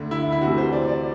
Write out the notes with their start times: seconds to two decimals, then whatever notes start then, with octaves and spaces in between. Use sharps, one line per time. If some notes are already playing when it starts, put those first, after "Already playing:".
Already playing: D2 D3
0.11 E4
0.32 E4
0.41 D2 C3 E3 F#4
0.58 C5
0.72 D5
0.88 D5